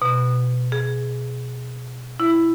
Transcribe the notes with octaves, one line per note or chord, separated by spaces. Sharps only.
B2
G#4
E4